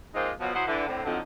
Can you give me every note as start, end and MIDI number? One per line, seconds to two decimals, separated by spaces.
0.15 0.30 53
0.15 0.30 56
0.15 0.30 58
0.15 0.30 60
0.15 0.30 63
0.15 0.30 65
0.40 0.53 47
0.40 0.53 53
0.40 0.53 54
0.54 0.64 54
0.54 0.64 64
0.54 0.64 72
0.54 0.64 75
0.54 0.64 78
0.67 0.85 50
0.67 0.85 52
0.88 1.00 45
0.88 1.00 50
0.88 1.00 60
1.04 1.19 41
1.04 1.19 50
1.04 1.19 53
1.04 1.19 54
1.04 1.19 60
1.04 1.19 63